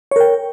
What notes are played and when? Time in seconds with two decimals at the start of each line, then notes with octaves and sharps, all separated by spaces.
0.11 C#5
0.16 A#4
0.20 G5